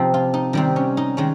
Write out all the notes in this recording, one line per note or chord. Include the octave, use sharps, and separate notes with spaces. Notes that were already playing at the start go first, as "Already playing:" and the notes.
Already playing: C3 F3 C4 D#4 G4
F4
D#4
C3 D#3 G3 C4
C#4
D#4
D#3 G#3 C#4